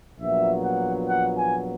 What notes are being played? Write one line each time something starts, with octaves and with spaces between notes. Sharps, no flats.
A#1 A#2 F#3 B3 E5
F#5
F#5
G#5